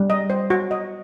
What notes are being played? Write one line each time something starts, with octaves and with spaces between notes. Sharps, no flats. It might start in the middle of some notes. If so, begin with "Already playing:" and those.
Already playing: G3
D#5
C5
F#4
D#5